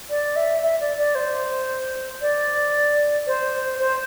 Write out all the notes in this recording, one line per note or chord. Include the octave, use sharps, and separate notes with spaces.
D5
E5
E5
D5
D5
C5
D5
C5
C5